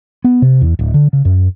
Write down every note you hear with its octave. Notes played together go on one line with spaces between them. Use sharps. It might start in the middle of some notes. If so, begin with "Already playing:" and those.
B3
C3
E2
D1
D3
C#3
F#2